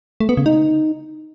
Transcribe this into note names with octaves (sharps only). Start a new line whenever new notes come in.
A3
B3
C#3
D#4